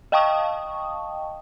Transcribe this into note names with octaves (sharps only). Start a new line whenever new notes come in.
D#5 F5 G5 A5 C#6 D#6